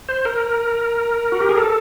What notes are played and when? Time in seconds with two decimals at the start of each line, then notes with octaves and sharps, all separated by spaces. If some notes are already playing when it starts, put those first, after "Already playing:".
0.09 C5
0.25 A#4
1.32 F#4
1.40 G4
1.49 G#4
1.58 A4